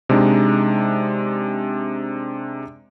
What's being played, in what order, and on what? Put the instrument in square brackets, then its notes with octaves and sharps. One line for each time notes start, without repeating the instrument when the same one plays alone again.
[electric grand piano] C3 G#3 D4 D#4